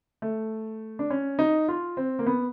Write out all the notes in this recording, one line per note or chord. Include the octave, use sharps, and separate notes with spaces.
A3
D4
C#4
D#4
F4
C4
A#3
B3